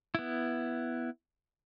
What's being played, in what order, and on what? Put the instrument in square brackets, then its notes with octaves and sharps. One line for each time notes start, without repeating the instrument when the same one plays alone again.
[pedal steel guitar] B3 E4